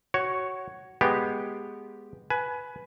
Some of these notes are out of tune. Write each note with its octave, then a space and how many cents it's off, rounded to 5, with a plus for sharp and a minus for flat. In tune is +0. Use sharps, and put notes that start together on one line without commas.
F#4 +15 C#5 +0
G#3 +0 B3 +0 G4 +0
B4 +0 G#5 +25